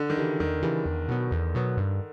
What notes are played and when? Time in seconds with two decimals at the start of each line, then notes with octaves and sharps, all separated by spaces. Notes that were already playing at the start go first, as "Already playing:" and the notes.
Already playing: D3
0.10 D#3
0.17 C#3 E3 G3
0.40 E2 D#3
0.62 C#3 E3 G3
0.85 E2
1.08 B2 F#3 B3
1.31 E2
1.55 B2 F#3 B3
1.77 G2